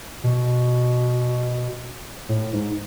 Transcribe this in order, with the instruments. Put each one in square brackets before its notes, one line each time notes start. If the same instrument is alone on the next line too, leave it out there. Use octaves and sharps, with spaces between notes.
[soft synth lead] B2
A2
G#2